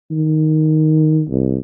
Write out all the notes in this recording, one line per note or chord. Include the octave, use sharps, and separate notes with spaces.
D#3
C2